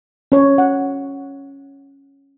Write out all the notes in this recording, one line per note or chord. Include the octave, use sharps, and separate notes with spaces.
C#4 C#5
F#5